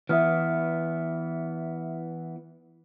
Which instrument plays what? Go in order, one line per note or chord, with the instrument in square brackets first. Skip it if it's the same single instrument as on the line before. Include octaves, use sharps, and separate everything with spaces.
[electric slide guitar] E3 B3 [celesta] E5 D#6 F6